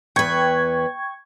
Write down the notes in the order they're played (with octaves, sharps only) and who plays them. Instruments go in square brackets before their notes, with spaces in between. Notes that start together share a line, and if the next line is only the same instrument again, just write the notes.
[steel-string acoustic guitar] E2 B4 [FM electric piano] G5 C#6 G#6